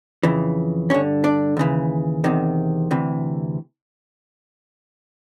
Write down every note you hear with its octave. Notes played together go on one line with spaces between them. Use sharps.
F2 C#3 E3
G2 D3 C#4 C#5
D4 D5
D#2 C#3 E3
E2 C3 D#3
D2 C3 E3